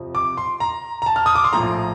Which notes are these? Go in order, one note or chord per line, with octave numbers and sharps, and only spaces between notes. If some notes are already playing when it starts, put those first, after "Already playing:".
Already playing: F2 C3 F3
D6
C6
A#5
A#5
A5
F6
D#6
D6
C6
A#1 A2 F3 A#5